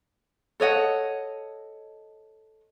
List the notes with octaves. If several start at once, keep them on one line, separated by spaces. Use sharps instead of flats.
A4 C#5 D#5 F#5